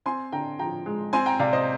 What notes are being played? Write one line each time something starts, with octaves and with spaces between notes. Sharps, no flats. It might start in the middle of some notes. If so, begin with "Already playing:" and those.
C4 G#5 C6
D3 G5 A#5
F3 G5 A#5
G#3
C4 G#5 C6
G5 A#5
C3 D5 F5
C5 D#5